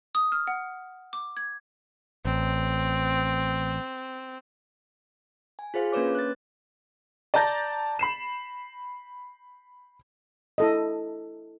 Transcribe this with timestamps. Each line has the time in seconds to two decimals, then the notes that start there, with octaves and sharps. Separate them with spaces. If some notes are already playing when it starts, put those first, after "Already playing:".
0.15 D#6
0.32 F6
0.47 F#5
1.13 D6
1.37 G#6
2.25 A1 C4
5.59 G#5
5.74 F4 G#4 C5 F5
5.93 A#3 C#4 D4 B4 C#5 D6
6.15 F#6 A6
7.34 D5 A5 A#5 G6 A6 A#6
7.99 B5 C7 E7
10.58 E4 A4 D#5